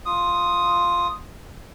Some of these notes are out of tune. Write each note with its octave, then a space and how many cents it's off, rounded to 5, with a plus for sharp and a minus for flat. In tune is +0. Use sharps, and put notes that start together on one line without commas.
F4 +0 D#6 +0